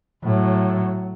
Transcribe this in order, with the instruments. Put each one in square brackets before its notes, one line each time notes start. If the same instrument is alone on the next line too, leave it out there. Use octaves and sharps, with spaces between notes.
[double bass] A2 F#3